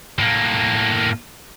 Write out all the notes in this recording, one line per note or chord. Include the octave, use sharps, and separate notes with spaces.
A2 A#3